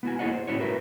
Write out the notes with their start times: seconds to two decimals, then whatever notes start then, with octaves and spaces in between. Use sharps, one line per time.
0.03 B3 E4 F#4 G#5
0.19 A#3 E4 G#4 C#5 D#5 F#5
0.33 C5
0.47 A2 C#4 E4 F#4 C#5
0.60 E4 F#4 G4 A#4 B4 E5